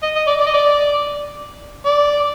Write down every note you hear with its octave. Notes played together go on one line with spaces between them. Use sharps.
D#5
D#5
D5
D5
D#5
D5
D5